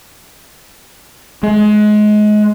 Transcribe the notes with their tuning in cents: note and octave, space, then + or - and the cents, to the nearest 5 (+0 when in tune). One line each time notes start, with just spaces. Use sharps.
G#3 +25